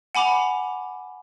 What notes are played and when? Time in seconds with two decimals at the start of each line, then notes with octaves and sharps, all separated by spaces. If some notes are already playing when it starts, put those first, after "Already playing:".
0.15 F#5 G#5 B5 D6 F7